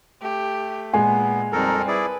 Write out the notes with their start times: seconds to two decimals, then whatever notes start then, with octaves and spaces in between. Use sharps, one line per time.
0.22 A3 G4
0.93 A#2 G#3 B3 G#5
1.53 F2 G3 C4 D#4 A4 A#4
1.88 E4 G#4 B4 D5